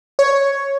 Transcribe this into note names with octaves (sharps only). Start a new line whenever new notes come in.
C#5